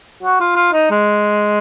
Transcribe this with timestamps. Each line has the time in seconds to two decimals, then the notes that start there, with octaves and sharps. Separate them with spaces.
0.23 F#4
0.40 F4
0.56 F4
0.73 D#4
0.90 G#3